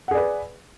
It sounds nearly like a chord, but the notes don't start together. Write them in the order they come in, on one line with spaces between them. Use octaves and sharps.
F#5 G#4 D5 B4